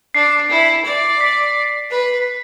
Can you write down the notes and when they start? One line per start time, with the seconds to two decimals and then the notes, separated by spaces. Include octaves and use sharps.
0.14 D4 C7
0.50 E4
0.85 D5
1.21 B6
1.90 B4